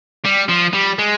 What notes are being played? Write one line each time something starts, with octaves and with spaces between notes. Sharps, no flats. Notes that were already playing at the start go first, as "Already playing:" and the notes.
G3
F3
G3
G#3